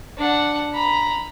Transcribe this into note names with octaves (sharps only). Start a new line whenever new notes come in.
D4 F#5
A#5 B5